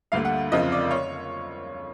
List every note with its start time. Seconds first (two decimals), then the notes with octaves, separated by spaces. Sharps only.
0.12 D2 D3 G3 A#3 F5
0.25 F#5
0.52 F#1 F2 C#3 F3 D#5
0.72 D5
0.91 C#5